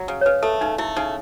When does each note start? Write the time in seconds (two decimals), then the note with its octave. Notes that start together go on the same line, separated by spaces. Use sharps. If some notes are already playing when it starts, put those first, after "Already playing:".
Already playing: F#3
0.08 C#3
0.21 C#5
0.26 C#3 B4
0.43 A3 A4
0.61 C#3 D#4
0.78 A3 E4
0.96 C#3 D#4